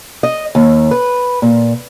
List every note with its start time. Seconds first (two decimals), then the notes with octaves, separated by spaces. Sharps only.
0.23 D#5
0.55 D#2
0.91 B4
1.42 A#2